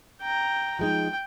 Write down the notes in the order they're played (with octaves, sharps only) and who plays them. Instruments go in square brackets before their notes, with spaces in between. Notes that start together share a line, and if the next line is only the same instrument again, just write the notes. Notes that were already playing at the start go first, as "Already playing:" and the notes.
[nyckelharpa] G5 A#5
[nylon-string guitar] F3 G#3 D#4 [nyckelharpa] G5